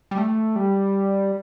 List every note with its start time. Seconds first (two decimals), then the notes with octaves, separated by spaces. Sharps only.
0.11 G3
0.18 A3
0.56 G3